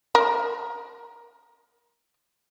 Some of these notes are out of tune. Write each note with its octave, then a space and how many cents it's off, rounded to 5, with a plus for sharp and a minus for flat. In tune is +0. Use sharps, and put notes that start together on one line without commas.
A#4 +5